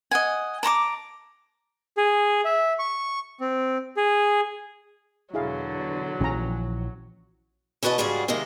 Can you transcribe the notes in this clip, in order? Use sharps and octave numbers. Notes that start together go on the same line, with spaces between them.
D#5 F#5 G#5
A5 A#5 C#6 D6
G#4
E5
C#6
C4
G#4
E2 B2 D3 F#3 E4 G#4 F5
A#1 E3 F3 C#4 A#5
E2 B2 F#4 B4 D#5 A5
G#2 C#3 G3 F4 F#4 G#4
C3 D#3 G#3 A#3 D#5